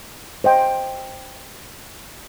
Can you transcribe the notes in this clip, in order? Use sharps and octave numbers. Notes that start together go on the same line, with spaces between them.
C5 D#5 G5